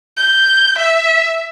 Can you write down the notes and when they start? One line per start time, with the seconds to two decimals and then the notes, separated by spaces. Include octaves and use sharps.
0.17 G6
0.78 E5